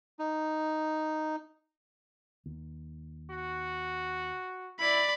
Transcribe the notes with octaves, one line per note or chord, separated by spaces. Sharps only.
D#4
D#2
F#4
E4 D5 B5